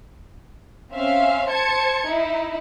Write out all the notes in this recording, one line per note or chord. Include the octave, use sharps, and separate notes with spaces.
C4 C#4 E5 F5
C5 A5 G#6 C#7
D#4 E4